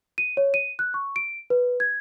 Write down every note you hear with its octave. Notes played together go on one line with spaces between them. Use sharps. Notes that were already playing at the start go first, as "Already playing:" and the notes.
D#7
C#5
D#7
F#6
C#6
D7
B4
G#6